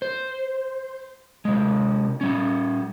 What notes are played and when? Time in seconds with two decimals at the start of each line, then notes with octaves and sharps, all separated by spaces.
0.02 C5
1.45 C3 G#3
2.21 G3 C#4